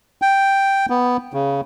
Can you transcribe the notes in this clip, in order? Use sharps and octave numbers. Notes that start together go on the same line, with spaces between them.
G5
B3
C#3